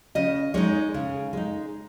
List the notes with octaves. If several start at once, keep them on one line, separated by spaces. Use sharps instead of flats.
C#3 D#5
G#3 D#4 C#5
C#3
G#3 D#4